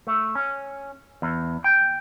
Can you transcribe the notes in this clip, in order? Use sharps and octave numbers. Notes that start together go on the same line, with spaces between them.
A3
C#4
E2
G5